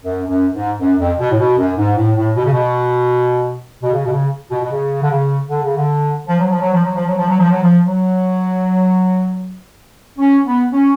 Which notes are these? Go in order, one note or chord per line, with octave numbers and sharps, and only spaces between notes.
F#2
F#2
G#2
F#2
F2
B2
A2
B2
F#2
G#2
A2
A2
B2
C#3
B2
B2
C#3
B2
C#3
B2
B2
C#3
D3
C#3
D3
C#3
D3
F3
F#3
F3
F#3
F3
F#3
F3
F#3
F3
F#3
F3
F#3
F3
F#3
C#4
B3
C#4